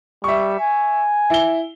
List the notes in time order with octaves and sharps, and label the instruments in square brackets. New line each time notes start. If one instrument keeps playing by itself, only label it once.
[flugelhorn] G3 [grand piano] E5 C#6
[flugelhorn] G#5
[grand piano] E4 G7